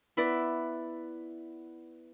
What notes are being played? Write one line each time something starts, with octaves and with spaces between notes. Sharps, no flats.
B3 E4 B4 D5